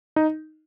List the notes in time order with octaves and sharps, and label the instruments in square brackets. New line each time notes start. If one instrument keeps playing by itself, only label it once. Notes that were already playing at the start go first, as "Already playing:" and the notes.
[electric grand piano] D#4